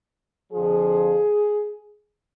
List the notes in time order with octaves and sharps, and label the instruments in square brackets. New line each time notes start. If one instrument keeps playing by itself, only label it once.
[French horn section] F2 D3 F3 G#4